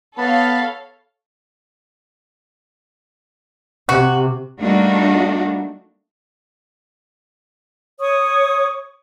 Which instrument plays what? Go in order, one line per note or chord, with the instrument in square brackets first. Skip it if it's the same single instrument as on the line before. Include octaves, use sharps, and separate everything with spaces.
[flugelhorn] B3 [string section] A4 C#5 F5 [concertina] A5 B5
[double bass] C3 [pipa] F#4
[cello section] G3 A3 A#3 D4 D#4 F#4
[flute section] C#5 C#6 D#6